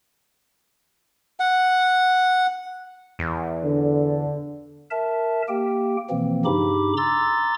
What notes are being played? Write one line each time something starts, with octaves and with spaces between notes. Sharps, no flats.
F#5
E2
D3
A#4 E5 A5
A#3 G4 G5
B2 E3 F3 A#3 C4
G2 C#3 D#4 G4 B5 D6
A#5 C6 D6 E6 A6